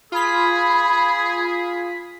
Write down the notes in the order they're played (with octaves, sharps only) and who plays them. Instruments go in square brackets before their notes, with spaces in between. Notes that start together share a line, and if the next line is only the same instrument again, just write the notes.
[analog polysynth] F4 B6 [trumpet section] G#4 [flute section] B5